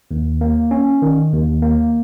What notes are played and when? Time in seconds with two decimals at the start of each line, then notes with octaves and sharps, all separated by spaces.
0.11 D#2
0.41 A#3
0.71 C#4
1.02 D#3
1.33 D#2
1.62 A#3